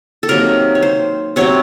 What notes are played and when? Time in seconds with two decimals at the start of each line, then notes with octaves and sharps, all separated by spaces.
0.23 A4
0.29 C3 D#3 F#3 A#3 A#4
0.75 C#5
0.82 C5
1.36 C3 F#3 C4 C#5